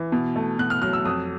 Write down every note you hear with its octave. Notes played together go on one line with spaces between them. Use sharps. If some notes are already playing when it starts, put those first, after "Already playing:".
Already playing: E3
B2
A3
B2 F#6
F6
F#3 F6
E6
F2 D#6